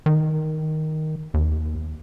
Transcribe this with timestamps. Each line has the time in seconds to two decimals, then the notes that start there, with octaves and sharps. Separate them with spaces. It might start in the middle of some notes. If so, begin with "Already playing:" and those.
0.06 D#3
1.34 D#2